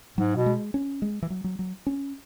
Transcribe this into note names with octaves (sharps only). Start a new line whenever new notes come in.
G#2 F#3
B2
G#3
C#4
G#3
E3
F#3
F#3
F#3
C#4